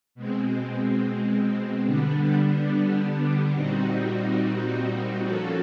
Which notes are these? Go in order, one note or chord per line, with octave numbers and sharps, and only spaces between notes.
B2 G#3 C4
D3 G3 B3 D4
A#2 G3 C4 D#4 F#4
F3 A#3 C#4 F#4 A4